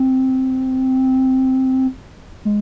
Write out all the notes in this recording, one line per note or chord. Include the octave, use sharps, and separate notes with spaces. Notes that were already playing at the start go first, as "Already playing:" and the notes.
Already playing: C4
G#3